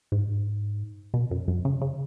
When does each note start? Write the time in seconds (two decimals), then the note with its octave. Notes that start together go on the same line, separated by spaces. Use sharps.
0.12 G#2
1.14 B2
1.31 F#2
1.48 F#2
1.65 C#3
1.81 C#3